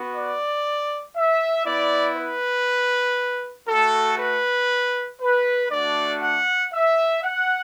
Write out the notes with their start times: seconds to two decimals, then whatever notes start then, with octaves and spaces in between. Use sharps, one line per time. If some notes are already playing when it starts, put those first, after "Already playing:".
Already playing: B3 F#4
0.14 D5
1.16 E5
1.66 B3 E4 D5
2.17 B4
3.68 A3 F#4 A4
4.19 B4
5.21 B4
5.71 A3 D4 F#4 D5
6.22 F#5
6.73 E5
7.23 F#5